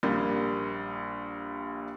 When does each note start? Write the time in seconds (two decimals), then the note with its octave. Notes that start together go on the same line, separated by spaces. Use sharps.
0.03 A#1 G3 A#3